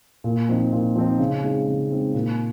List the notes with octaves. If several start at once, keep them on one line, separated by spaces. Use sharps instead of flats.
A#2
F3 C4 D#4
A#2
F3 C4 D#4
C#3
G#3 C4 D#4
C#3
G#3 C4 D#4
A#2